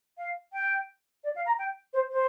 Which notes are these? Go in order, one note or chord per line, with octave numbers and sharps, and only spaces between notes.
F5
G5
D5
F5
A#5
G5
C5
C5